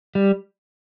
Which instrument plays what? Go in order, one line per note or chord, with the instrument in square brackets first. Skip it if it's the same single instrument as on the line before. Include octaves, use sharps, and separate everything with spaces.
[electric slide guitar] G3